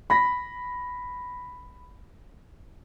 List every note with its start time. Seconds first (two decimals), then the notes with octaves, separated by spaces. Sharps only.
0.10 B5 A#6 B6